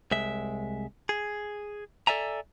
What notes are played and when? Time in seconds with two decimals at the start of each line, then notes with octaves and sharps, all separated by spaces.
0.11 C2 G#3 E5
1.09 G#4
2.07 A4 D5 E5 G#5 A#5